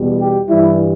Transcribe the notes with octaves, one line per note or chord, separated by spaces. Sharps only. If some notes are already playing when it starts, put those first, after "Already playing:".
Already playing: E2 B2 G3
G4
G2 E3 G3 E4